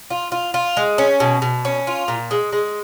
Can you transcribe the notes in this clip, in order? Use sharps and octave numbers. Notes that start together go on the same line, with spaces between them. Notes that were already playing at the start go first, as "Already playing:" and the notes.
F4
F4
F4
G#3
C#4
B2
B2
C#4
F4
A#2
G#3
G#3